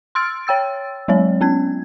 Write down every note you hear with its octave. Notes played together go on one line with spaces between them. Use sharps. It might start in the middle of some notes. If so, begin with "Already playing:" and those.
C6 E6 F6 A6 D7
C#5 G5 E6 A6
F#3 G#3 C4 C#5
B3 C#4 G#6